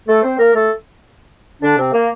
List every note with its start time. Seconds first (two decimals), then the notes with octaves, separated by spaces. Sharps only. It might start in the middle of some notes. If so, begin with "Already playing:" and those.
0.08 A3 A4
0.23 C4 C5
0.38 A#3 A#4
0.54 A3 A4
1.61 D3 D4
1.77 C3 C4
1.92 A#3